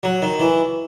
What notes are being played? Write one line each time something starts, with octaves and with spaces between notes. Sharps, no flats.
F#3
D#3
E3